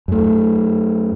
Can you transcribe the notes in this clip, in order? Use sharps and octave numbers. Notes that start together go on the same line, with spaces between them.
F#2 A3